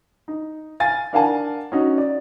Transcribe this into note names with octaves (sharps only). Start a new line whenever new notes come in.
D#4
F5 G#5 A6
D4 A#4 F5 F#5 G#5 A5
C#4 D#4 F#4
D5